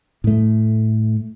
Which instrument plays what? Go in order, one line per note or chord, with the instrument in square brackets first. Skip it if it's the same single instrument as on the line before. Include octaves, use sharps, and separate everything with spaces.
[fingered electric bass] A2 A3